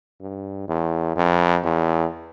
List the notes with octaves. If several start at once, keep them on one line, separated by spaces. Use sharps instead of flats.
G2
E2
F2
E2